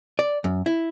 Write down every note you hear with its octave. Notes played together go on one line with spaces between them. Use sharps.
D5
F#2
E4